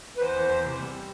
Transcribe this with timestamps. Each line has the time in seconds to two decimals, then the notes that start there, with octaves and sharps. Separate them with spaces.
0.17 B4
0.21 E2 C5
0.36 E2
0.49 E2
0.64 C3
0.79 G3